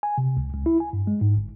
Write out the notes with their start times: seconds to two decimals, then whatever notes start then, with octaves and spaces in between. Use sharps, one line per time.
0.03 G#5
0.18 C3
0.37 C#2
0.54 C#2
0.66 E4
0.80 G#5
0.93 G2
1.07 G#3
1.21 G#2
1.37 G1